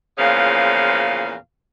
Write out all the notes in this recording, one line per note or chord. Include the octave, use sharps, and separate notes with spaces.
E2 A#2 C#3 F3 F5